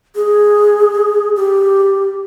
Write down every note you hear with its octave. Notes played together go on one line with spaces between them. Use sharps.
G#4
G4